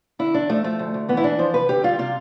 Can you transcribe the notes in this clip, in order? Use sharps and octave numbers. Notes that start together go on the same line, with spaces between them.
D3 E4
E2 D4
F3 A3
F3 A3
D2
D2
E3 B3
E4
E3 D4
F3 C5
C3 B4
D3 G4
G3 F4
C3 F4